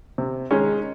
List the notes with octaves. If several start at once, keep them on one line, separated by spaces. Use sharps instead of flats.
C3
D#3 G#3 C#4